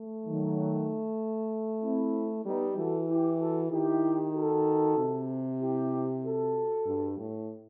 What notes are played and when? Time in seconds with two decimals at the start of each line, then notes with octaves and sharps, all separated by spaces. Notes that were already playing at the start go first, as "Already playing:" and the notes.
Already playing: A3
0.25 D#3 F#3
1.83 C4 E4
2.45 G3 B3 D#4
2.76 E3 F#4 A4
3.08 E4 G4
3.39 F#4 A4
3.71 D#3 E4 G4
4.34 F#4 A4
4.97 C3
5.60 E4 G4
6.23 F#4 A4
6.86 G2
7.18 A2